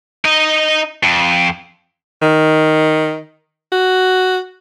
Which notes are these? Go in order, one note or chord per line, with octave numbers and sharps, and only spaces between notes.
D#4 D#5
F2
D#3
F#4